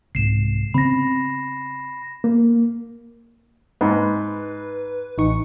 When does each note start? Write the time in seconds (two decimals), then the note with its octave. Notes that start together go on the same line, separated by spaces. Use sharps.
0.15 C2 G#2 C7 E7
0.74 C#3 B3 C4 B5 A#6
2.24 A#3
3.81 G#2 B4
5.18 A1 D#4 C#6